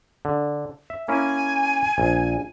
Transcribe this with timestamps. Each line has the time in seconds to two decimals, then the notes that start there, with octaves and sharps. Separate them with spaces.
0.25 D3
0.90 E5
1.08 A#3 C#4 E4 G#5
1.98 A#1